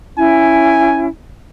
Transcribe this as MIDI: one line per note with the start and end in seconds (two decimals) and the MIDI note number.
0.18 1.08 61
0.18 1.08 64
0.18 1.07 80